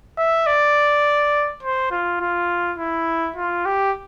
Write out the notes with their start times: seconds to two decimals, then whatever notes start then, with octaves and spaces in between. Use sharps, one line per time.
0.18 E5
0.47 D5
1.63 C5
1.91 F4
2.21 F4
2.78 E4
3.36 F4
3.66 G4